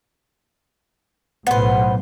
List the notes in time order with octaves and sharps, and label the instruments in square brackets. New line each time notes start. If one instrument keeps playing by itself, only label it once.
[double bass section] B1 A2 [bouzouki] B3 C5